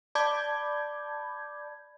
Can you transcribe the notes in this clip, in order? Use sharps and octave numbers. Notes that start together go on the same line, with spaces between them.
D5 A5 B5 D6 G6 G#6